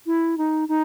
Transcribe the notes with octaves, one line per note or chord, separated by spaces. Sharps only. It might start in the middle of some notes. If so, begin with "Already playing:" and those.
E4
D#4
D#4